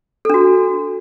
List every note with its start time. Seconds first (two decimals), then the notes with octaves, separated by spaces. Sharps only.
0.25 A4
0.30 D4
0.34 F#4